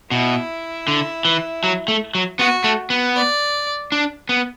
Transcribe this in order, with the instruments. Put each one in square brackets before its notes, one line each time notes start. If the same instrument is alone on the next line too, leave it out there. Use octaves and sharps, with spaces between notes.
[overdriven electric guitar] B2 [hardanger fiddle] E4
[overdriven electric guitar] D3
E3
F#3
A3
F#3
[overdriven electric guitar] B3 [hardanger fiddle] F#4
[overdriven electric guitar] A3
B3
[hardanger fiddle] D5
[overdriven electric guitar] D4
B3